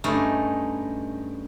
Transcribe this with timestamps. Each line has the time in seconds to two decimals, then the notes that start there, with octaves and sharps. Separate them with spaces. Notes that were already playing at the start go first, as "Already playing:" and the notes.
0.04 G2 G#3 A3 C#4 D#4